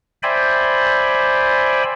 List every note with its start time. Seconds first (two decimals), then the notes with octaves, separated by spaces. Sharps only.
0.23 C5 D5 E5 G5 G#5 B5